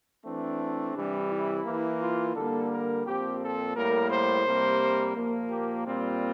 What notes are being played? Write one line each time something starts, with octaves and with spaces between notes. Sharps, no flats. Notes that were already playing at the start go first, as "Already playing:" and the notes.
E3 A3 C4 D4
C3 E3 G3
E4
E3 A#3
F4
D3 G3 A#3 A4
A#4
A#2 F3 C4 G4
A4
A2 G3 A#3 A#4
C5
C3 G3 A#3
A#2 F3 A#3
G4
A#2 G3 C4 F4